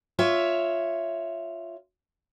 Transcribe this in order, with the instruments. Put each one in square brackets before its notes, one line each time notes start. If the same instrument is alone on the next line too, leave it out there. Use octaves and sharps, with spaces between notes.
[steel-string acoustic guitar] F4 C#5 E5